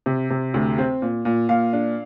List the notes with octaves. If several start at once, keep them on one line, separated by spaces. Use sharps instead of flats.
C3
C3
D2
C4
A#2
A#2
A#2 F5
D4